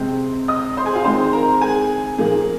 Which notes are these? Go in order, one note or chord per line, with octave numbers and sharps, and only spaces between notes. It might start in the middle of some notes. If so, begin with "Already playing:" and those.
Already playing: C3 G#3 C4 C5
D#5 D#6
C5 C6
G#4 G#5
F4 F5
D#3 G#3 C4 C5 C6
A#4 A#5
G#4 G#5
A#2 F3 A#3 G#4